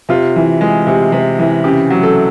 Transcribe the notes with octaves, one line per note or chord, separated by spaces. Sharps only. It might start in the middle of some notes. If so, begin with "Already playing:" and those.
C3 F4
E3
G#3
C3
C3
E3
C#3 G4
F#3
A4